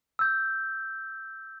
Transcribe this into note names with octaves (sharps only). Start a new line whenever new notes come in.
E6 G6